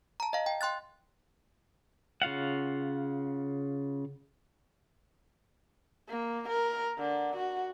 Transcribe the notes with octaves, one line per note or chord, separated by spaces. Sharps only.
A5 A#5
D#5 F5
G5
G5 C6 F#6 A6
C#3 F4 F5 F#5
A#3
A#4
D3
F#4